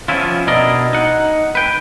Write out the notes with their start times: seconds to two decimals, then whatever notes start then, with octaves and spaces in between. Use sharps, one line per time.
0.08 F3 B3 C#4 E4 F4
0.47 B2 D4 E4 A#4 D5 D#5
0.93 D#4 F#5
1.55 B4 G5